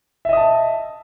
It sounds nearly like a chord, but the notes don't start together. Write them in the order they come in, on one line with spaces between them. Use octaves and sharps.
E5 D#5 D#6 A5